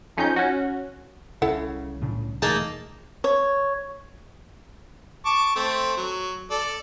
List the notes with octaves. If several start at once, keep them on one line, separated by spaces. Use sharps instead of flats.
F2 C#4 D#4 G6
C#4 F#4
C2 C#3 E4 A4 F#5
A2 C#3 D4
E1 A3 A#3 D#4 G#4 A5
C#5
A5 C#6 D6
A3 C4
F#3
A4 D5